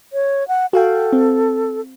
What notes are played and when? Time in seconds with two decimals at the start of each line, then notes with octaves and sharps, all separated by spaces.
0.13 C#5
0.48 F#5
0.73 F#4 A4 F5 G5
1.13 C4